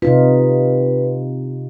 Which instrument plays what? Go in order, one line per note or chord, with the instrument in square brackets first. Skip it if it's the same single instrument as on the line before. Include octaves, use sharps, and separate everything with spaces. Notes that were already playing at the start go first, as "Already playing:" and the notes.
[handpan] C3 D#4 F4 [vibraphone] B4